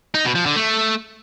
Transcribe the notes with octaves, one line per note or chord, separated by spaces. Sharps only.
D#4
B2
F3
D3
A3